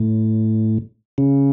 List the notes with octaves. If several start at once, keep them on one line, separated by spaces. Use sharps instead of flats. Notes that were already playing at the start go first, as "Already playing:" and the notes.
Already playing: A2
C#3